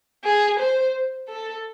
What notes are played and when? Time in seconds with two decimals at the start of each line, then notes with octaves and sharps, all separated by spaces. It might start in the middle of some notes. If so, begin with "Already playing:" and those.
0.24 G#4
0.59 C5
1.28 A4